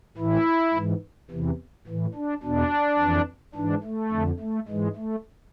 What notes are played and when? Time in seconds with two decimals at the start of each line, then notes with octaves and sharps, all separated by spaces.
0.18 A2 E3 E4
0.73 G#2 E3
1.31 E2 C3 E3
1.87 A2 E3
2.14 D4
2.43 E2 B2 D4
2.99 F2 E3
3.55 G#2 E3 D4
3.83 A3
4.12 F2 D3
4.40 A3
4.68 G#2 E3 G#3
4.96 A3